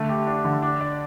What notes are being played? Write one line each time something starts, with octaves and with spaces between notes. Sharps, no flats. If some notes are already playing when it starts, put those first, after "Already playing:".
Already playing: D3 A3
G4
D4
D3
D4
D5